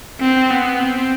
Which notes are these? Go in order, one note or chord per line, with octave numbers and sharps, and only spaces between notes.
C4
B3
C4